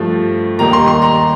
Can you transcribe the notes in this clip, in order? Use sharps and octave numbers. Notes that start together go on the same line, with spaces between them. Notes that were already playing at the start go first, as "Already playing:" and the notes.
Already playing: G2 F3 A3
D#2 D#3 G3 A#3 A#5
C6
C6
A#5